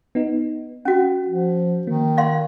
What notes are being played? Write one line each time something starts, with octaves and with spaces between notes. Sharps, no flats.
B3 D#4
C#4 F#4 F#5
F3
D#3 A#3
D5 F5 C6